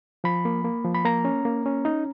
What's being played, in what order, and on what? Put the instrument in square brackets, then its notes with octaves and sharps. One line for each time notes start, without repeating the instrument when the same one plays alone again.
[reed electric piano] F3 B5
A#3
A#3
F3
B5
A#3 A#5
C#4
A#3
C#4
D#4